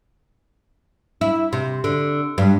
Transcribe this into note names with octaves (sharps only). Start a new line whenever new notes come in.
E4
C3
D3
G2